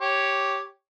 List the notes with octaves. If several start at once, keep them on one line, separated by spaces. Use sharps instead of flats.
G4 C#5